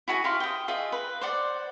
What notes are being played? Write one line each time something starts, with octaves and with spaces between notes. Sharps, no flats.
E4 F#4 G#4 G#5
E4 G4 F5 C6
G5 D#6
F4 G#4 D#5 E5
B4
C5 D5 F#5